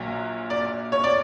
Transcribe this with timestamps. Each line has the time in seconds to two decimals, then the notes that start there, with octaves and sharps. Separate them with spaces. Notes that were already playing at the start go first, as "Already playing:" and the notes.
Already playing: A#1 A#2 F#3
0.50 D5
0.92 C#5
1.04 D5